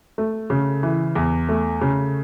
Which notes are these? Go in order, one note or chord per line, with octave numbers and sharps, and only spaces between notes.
A3
C#3
E3
E2
A3
C#3